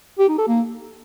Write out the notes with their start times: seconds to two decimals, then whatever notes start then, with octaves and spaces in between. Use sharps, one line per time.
0.19 G4
0.29 D#4
0.38 A4
0.48 A#3